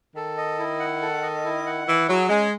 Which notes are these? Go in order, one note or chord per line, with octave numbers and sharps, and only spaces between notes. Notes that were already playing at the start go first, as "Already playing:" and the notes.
D#3 A4
D#5
E4
F#5
A4
D#5
E4
F#5
E3 E4
F#3 G#4
G#3 C#4